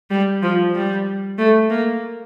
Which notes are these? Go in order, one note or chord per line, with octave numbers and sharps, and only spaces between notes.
G3
F3
G3
A3
A#3